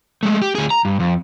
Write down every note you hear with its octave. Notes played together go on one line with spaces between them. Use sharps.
G#3 A3
G4
D2 G#4
A#5
G2
F2